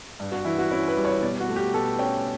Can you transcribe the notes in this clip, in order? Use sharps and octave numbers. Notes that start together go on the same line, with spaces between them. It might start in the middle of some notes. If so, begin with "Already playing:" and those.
G2
F#4
E3 E4
F#4
C#4 E4
B4
G3
C#5
B2 D5
F#4
A3
G4
B2 A4
C#4 G5